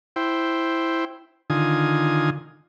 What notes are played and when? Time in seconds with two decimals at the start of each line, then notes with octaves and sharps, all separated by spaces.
0.16 E4 C5 G5
1.50 D3 D#3 F4 G#5 D#6